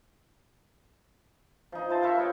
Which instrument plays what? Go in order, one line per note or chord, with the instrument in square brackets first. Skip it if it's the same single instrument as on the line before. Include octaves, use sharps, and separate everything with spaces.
[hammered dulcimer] F3 D#4
E4 C5 A5
F4 A#4 E5 C#6
B4 C#5 D#5 G5